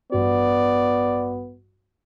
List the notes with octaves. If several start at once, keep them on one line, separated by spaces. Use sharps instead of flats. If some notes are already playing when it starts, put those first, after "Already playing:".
A1 G2 B3 F#4 D5